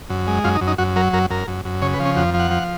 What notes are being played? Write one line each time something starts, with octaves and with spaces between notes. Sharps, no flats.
F#2
G#3
F#2 F4
D#4
F#2
D#4
F#2 F#4
F#3 A#4
F#2 A#4
F#2 A#4
F#2
F#2
C#3 C#5
B4
F3
C#4
F2 F#4
F3
F#5
F3